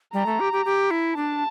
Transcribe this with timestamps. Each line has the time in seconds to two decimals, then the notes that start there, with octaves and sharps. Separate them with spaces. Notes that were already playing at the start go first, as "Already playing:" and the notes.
0.14 G3 A#5
0.26 A3
0.40 G4
0.53 G4
0.65 G4
0.91 E4
1.16 D4 A5